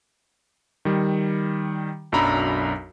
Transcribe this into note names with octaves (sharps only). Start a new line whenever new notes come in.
D#3 G3
B1 F#2 D4 A#5 B5 E6